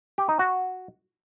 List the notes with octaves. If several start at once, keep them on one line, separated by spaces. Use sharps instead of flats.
G4
D#4
F#4